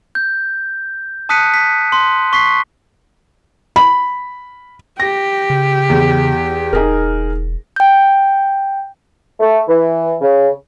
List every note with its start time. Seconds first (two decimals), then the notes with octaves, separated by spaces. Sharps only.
0.15 G6
1.29 A5 D#6 F#6 B6 C#7 D#7
1.54 B6
1.92 C6
2.33 C#6 B6 C7
3.76 B5
5.00 G4 A#6
5.50 C#3
5.90 E2
6.73 E1 D#4 G#4 A#4
7.76 G5 G6
9.40 A3
9.68 E3
10.21 C#3